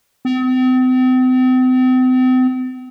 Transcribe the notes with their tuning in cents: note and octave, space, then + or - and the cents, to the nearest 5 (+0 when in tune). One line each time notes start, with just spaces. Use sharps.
C4 -40